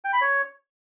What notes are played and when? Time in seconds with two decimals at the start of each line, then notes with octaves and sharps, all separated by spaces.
0.04 G5
0.13 B5
0.21 C#5